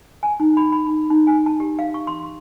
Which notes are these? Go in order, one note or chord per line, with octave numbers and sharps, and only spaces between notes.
G#5
D#4
B5
B5
D#4
D#4
G#5
A5
G4
F5
C#6
C6